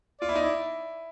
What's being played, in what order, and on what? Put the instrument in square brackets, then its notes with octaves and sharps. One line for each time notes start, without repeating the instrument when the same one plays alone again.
[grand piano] F4 [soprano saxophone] D5
[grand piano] E4
D#4
E4